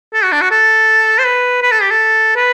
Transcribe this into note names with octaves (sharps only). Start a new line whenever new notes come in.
A4
F#4
D4
F#4
A4
C5
B4
B4
A4
G4
A4
B4